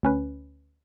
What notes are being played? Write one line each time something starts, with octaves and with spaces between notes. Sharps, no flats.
D2 C#4 B4